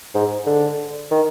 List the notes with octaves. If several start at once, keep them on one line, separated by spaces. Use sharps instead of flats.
G#2
D3
D#3